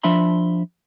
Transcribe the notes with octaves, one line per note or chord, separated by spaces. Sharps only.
F3 D4 E5 B5 C6